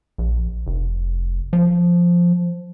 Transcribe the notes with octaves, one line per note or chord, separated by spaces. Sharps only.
A#1
F1
F3